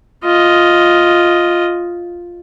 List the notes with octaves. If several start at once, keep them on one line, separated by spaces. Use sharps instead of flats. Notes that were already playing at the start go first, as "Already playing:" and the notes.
F4 D#5